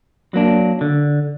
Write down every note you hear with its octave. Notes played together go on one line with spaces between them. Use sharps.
F#3 A#3 D4
D3